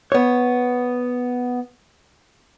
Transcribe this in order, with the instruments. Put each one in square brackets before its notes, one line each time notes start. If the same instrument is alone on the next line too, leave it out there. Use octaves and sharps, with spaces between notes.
[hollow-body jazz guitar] B3 C#5